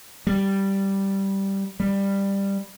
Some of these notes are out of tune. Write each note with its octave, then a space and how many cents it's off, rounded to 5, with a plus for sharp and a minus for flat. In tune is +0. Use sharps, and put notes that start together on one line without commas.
G3 -5
G3 +10